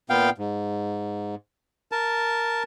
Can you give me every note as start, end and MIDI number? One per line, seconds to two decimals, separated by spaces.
0.10 0.30 46
0.10 0.30 59
0.10 0.30 77
0.10 0.30 79
0.38 1.35 44
1.92 2.63 70
1.92 2.63 81